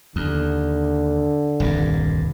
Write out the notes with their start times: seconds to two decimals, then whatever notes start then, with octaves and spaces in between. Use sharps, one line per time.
0.16 D#2 D3
1.60 D#1 C2 G2